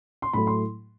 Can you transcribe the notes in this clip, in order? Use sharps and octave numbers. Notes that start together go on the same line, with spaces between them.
C6
A2 F#3 A3 B5
C6